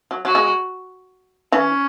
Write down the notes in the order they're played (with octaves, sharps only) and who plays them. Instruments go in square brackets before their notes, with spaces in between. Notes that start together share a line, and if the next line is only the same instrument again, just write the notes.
[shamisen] F#3
[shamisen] F#3 [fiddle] F#4
[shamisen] G#3
[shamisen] E3 [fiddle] C#4